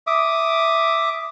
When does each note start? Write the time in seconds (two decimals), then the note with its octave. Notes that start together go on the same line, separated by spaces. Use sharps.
0.07 E5 D6 D#6